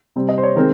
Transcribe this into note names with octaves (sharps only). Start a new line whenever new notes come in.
C3 G3 C4
D#5
C5
C#5
D#3 G#3 C4 A#4